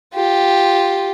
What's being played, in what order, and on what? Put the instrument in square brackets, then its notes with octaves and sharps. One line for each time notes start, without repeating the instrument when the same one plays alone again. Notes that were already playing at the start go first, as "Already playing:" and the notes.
[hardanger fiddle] F4 G4